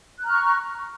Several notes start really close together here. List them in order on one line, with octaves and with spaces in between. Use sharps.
F#6 A#5 F6 C#6